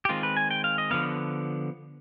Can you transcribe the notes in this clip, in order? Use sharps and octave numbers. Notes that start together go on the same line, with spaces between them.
G4
D#3 G#3 C4 F4
B4
G#5
G5
F5
D#5
D3 F3 B3 F5